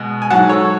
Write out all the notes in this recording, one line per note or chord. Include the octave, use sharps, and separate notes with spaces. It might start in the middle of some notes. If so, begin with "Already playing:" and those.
Already playing: B2 G#3
G#5
G#2 F#3 F#5 A5
A4 C#5